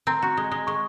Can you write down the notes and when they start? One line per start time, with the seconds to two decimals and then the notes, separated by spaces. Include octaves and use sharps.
0.07 C4 A#5
0.22 F#4
0.37 G#3
0.52 G#3
0.67 G#3 C#6